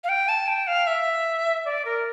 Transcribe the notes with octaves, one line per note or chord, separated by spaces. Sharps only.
F5
G5
A5
G5
F5
E5
D5
A#4